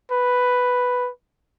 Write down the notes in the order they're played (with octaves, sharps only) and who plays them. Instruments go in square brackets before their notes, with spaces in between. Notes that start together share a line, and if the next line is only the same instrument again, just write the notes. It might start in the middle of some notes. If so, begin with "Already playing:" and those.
[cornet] B4